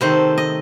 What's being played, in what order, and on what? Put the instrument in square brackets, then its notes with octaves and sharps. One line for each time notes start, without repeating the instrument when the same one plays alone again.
[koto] C3 D#3 A3 C5
D#5